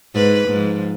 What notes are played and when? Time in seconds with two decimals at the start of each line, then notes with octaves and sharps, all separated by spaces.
0.14 G#2 B4
0.48 G#2 F3